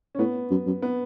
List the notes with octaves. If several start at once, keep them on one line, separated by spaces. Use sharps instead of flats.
C#4
A2 B3
F#2
F#2
B3